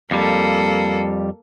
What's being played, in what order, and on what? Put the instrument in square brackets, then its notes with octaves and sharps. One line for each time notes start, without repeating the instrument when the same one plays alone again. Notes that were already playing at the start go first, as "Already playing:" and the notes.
[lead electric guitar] F2 G3 [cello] A#3 A4